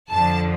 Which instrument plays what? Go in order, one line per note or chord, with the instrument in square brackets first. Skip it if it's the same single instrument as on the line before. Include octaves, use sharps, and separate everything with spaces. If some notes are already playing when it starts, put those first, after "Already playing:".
[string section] F2 D3 F3 A5